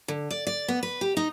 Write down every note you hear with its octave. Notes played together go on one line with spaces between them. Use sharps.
D3
D5
D5
B3
B4
G4
D#4